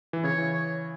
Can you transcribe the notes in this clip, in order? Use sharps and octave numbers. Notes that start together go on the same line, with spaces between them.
E3
C#3 C#5
E3
C#5